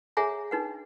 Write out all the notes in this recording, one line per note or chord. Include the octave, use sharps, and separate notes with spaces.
G#4 C#5 E5 F#5 G#5 A#5
D4 D#4 B4 F#5